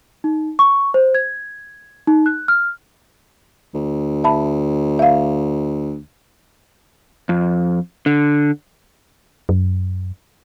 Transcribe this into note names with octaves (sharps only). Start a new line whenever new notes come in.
D#4
C#6
C5
G#6
D#4
F#6
F6
D2
E5 A5 B5
E5 F5
F2
D3
F#2